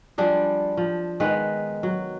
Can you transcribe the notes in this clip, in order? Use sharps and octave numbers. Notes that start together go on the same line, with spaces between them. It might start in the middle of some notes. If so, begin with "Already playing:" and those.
F3 G3 D4 G#4
F3
D#3 G#3 B3 B4
F#3